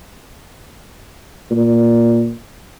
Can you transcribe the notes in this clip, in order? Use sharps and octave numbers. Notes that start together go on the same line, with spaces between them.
A#2